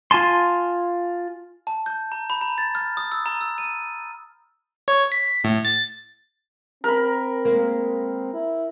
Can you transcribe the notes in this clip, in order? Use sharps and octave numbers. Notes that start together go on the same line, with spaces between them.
F4 G#5 A5 C6
A5
G6
A#5
B5
A#5
A6
F6
D#6
E6
A#5
E6
D#7
C#5
B6
A2
A6
C4 A#4 B5
G#3 A#3
E4